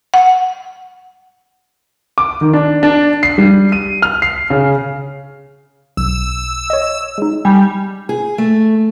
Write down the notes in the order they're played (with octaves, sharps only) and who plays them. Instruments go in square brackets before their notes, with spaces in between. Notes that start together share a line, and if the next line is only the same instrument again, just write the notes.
[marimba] F#5
[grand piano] D6
D#3
D4
D4
C7
G3
D#7
F6
C7
C#3
[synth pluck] B1 [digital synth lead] E6
[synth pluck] C#5 D#5
G#3 D#4
[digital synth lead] G3 [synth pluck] G#5
[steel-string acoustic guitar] G#4
A3